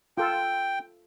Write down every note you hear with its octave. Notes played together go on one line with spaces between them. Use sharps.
F4 A4 G5